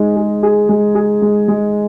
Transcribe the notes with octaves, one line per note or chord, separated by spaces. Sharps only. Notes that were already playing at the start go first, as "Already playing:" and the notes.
Already playing: G#3 D#4
G#4
G#4
G#3
G#4
G#3
G#3